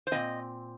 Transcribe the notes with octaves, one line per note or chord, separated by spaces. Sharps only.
C5
A#2 G#3 C4 D#5